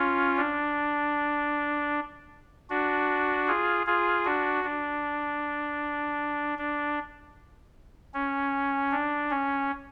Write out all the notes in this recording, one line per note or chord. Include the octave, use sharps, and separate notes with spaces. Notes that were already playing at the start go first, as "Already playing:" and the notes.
Already playing: C#4 F4
D4
D4 F#4
F4 G#4
F4 G#4
D4 F#4
D4
D4
C#4
D4
C#4